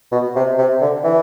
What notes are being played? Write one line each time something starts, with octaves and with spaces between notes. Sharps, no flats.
B2
C3
C3
D3
E3